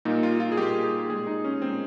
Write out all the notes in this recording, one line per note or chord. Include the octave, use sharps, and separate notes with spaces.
A#2 G3 A#3 D#4
F4
F4
G#4
A#2 G3 A#3 G4
G#4
A#2 G#3 G#4
D#4
C#4
A#2 G#3 C4